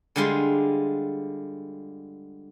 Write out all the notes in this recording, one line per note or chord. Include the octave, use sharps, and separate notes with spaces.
D3 G3 G#3 F4 C6